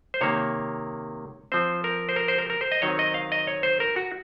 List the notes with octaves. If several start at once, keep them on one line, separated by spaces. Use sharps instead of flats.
C5
C3 D#3 A#3 C#5
F3 C4 C5
A#4
C5
A#4
C5
A#4
A#4
C5
D#5
D#3 F#3 C4 C#5
D#5
F5
D#5
C#5
C5
A#4
F#4